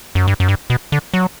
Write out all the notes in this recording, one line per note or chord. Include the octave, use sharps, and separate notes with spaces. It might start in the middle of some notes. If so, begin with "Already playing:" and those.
F#2
G2
F#2
G2
B2
D3
F#3